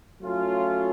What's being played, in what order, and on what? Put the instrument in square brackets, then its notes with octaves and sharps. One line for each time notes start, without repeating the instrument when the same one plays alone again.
[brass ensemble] F#3 A3 C#4 F4